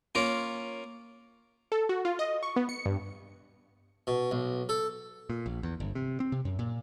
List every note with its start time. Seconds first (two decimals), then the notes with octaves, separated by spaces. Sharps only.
0.15 A#3 C#4 F4 A#4
1.72 A4
1.89 F#4
2.05 F4
2.19 D#5
2.43 C#6
2.56 B3
2.69 C#7
2.86 G2
4.07 B2
4.31 B1
4.69 A4
5.30 A#2
5.46 A#1
5.63 E2
5.80 G1
5.95 C3
6.20 C4
6.32 C3
6.45 F#2
6.59 A#2